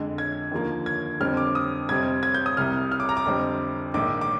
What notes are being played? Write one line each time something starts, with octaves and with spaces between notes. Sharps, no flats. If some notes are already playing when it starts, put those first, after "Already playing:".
Already playing: F2 D3 G#3
G#6
D#2 D3 F3 A#3
G#6
F2 D3 G3 C4 F6
D6
D#6
F2 C3 G3 C4 G#6
G#6
G6
D#6
C2 C3 G3 F6
F6
D6
A#5
D6
F2 D3 G3 C4
A#1 G#2 D#3 D6
D6